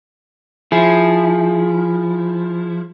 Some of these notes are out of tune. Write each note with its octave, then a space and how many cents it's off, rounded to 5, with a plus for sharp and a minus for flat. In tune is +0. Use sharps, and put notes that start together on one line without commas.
F3 +0 E4 +0 G#4 +0